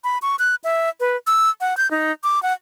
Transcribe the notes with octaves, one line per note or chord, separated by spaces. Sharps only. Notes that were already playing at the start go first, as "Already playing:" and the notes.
B5
C#6
F#6
E5
B4
E6
F#5
G6
D#4
D6
F#5